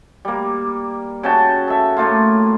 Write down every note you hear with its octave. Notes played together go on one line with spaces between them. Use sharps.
G3 A#3
C#3 F#4 G5 A5
A4 E5
A2 A3 A#3 F4